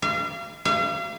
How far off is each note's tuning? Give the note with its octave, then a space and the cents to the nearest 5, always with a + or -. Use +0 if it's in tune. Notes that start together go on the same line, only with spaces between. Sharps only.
F5 -35
F5 -40